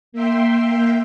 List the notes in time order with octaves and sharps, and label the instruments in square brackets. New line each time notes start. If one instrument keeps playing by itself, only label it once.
[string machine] A#3 E5 G5 C6